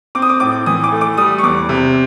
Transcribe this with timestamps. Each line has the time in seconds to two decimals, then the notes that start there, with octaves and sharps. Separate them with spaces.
0.15 C4 D6
0.22 D#6
0.29 D6
0.40 A2 D6
0.66 E3 D#6
0.84 D6
0.92 A3
1.01 D6
1.18 G3 D#6
1.38 C#6
1.43 E2 D6
1.69 C3